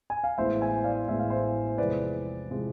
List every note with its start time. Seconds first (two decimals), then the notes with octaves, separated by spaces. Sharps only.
0.10 G#5
0.24 F5
0.38 A1 A2 G#3 B3 E4 C5 E5
0.61 E5 G#5
0.84 D5 F5
1.08 A1 A2 G#3 B3 E4 E5
1.19 F5
1.30 C5 E5
1.78 E2 C3 F3 G#3 C4 B4 D5
2.50 C3 F3 G#3 C4